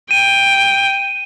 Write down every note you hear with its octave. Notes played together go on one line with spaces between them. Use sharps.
G5 D#7